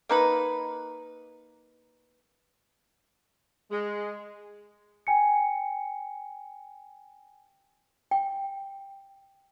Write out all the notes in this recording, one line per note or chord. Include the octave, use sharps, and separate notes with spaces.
A#3 D#4 B4
G#3
G5 G#5 C#7
G5